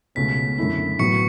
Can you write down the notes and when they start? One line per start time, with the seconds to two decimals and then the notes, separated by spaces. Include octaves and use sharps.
0.15 C#2 B2 A3 C#4 B6
0.58 F#2 D3 A3 E4
0.99 A2 F#3 B3 F#4 B4 C#6 C#7